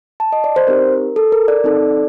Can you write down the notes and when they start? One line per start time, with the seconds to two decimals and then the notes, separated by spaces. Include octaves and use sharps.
0.20 A5
0.32 D#5
0.44 D5
0.56 C5
0.67 C4 D#4 G4 A#4
1.16 A4
1.32 A#4
1.48 D5
1.64 C4 D#4 A4